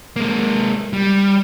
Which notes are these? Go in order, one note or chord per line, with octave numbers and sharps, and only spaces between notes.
G#3 A#3
G3